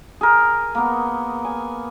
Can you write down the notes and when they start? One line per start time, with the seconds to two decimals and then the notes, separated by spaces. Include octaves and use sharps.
0.21 G#4 A#4
0.75 A#3 B3
1.45 G#5